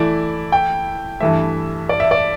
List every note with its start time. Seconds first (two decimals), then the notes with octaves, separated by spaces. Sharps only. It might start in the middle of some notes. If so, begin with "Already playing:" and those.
Already playing: E3 A3 E4 D5
0.52 G5
1.20 G2 E3 A3 E5
1.89 D5
2.00 E5
2.11 D5